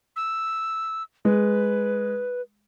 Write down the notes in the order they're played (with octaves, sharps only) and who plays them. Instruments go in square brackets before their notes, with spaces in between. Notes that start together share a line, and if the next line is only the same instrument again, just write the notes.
[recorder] E6
[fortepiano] G#3 [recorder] B4